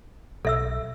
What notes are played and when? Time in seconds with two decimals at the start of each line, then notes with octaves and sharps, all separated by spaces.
0.45 B1 A4 E5 E6